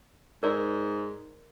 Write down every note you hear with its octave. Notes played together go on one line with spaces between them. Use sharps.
G#2 A#4 D5